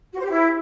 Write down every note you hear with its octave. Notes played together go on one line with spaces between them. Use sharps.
F#4
C5
G4
E4